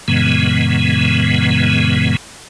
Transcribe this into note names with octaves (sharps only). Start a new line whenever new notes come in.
F#2 A#2 C#3 E3 G#3 B3